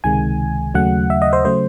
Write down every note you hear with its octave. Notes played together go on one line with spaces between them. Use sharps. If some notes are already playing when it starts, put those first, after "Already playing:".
C#2 C3 D#3 G#3 G#5
D#2 C#3 F#3 A3 F#5
E5
D#5
C5
C#3 F#3 A3 C5